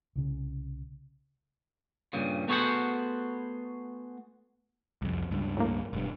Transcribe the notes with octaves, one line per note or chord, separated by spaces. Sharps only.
C2 C#3
G2 A#2 C#3
A3 B3 F#4 G#4 C5 F#5
C2 F2
C#2 G2
A2 A#3
E1 G2